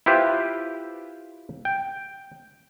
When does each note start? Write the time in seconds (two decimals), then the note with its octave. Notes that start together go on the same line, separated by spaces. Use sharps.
0.06 E4 F4 G4 B4 C5
1.65 G5